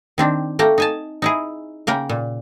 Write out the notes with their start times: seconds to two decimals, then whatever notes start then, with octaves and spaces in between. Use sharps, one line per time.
0.18 D#3 C4 D4
0.59 A3 A#3 G5 A#5
0.78 D#4 G#5 A5
1.22 D#4 E4 G#4
1.87 C#3 A#3 A#4 G5
2.09 A#2